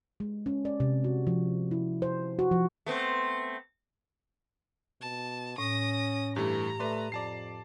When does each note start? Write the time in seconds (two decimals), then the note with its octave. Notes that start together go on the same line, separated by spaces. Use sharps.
0.20 G#3
0.46 C#4
0.65 D5
0.80 C3
1.04 F#4
1.27 F3
1.71 E4
2.02 C5
2.39 F#4
2.51 F3
2.86 A3 B3 C4
5.01 B2 A5
5.58 A2 C#4 D#6 A#6
6.36 G2 E3 A3 G4 A#5
6.80 A3 B4 D5 C6
7.12 F2 D5 A5 C7